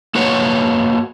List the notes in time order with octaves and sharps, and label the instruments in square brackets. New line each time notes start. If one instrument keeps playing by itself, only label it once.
[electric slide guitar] A#3 F#4 B4 C#5 F#5